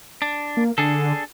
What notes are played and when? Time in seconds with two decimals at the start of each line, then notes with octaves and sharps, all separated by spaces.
0.22 D4
0.57 A#3
0.78 D3 D4 G#4 A4